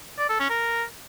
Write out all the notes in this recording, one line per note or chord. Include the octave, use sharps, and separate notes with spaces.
D5
A4
C#4
A#4